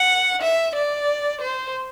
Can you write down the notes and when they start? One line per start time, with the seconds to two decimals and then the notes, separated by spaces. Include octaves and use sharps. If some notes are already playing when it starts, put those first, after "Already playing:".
Already playing: F#5
0.42 E5
0.75 D5
1.41 C5